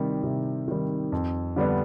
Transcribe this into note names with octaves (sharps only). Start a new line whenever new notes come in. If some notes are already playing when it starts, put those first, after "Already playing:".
Already playing: C3 D#3 G3
C3
D#3 G3
F2
D3 G3 B3 D4